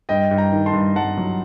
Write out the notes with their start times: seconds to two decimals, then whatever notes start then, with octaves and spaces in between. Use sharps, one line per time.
0.09 G2 D#5 G5
0.31 G2
0.38 G5 A#5
0.52 D#3
0.66 A5 C6
0.73 G2
0.96 G2 F#5 A5
1.17 F#3